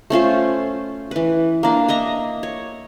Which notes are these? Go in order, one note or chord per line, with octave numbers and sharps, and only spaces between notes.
A3 C#4 F4 C5
E3 B4
A#3 D4
D#5 E5 A#5
C#5